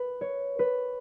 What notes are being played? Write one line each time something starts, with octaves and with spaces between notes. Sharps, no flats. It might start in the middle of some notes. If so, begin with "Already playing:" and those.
Already playing: B4
C#5
B4